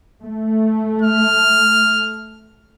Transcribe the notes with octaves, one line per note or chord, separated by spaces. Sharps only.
A3
F6